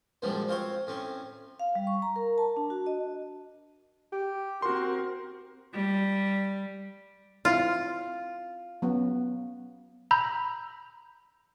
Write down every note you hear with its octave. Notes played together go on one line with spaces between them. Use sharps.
F#2 A#2 D#3 F3 G3 G#3
C4 F4 C5 C#5
A2 C4 C#4
F5
G3
C#6
A#5
A#4
A5
D4
F#4
D#5
G4
C4 F#4 A#4 C6
G3
C4 E4 F4
F#3 B3 C#4
A#5 B5 E6 G6